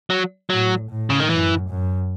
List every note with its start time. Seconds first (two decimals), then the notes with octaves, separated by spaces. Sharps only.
0.10 F#3
0.50 A2 F#3
0.90 A2
1.10 C#3
1.20 D#3
1.30 F#2 E3
1.69 F#2